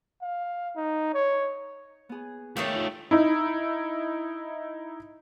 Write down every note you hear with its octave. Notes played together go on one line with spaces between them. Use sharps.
F5
D#4
C#5
B3 G#4
D#3 A3 D#4 G4 C#5 F5
F4
D#4 E4